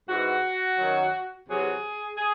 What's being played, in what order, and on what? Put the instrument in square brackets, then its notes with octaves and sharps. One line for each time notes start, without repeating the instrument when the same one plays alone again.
[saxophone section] G#2 E3 F#4
F#2 D#3 F#3
E2 C3 F#3 G#4
G#4